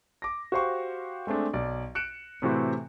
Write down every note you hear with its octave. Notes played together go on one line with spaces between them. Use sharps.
D6 A#6
F#4 G4 C5 F5 C#6
G#3 A3 C4 D4
B1 D5
F#6 C#7 D7 E7
A2 C3 E3 C4 F#4